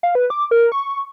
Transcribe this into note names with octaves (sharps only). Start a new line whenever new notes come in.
F5
B4
D6
A#4
C#6